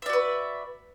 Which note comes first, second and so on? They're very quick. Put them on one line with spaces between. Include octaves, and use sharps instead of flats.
E5 D5 F#4 B4